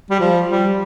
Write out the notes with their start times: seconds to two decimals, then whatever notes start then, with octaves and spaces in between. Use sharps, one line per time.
0.11 G3
0.20 F3
0.48 G3